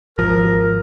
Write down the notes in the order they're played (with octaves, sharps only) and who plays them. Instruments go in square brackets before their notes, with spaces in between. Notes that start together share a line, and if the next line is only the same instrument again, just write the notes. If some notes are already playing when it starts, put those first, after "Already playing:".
[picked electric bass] G#1 F3 [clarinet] A#4